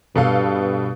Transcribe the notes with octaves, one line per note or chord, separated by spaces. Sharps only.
G2 B2 A4 F5